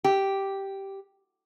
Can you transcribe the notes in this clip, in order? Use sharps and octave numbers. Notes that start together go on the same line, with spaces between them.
G4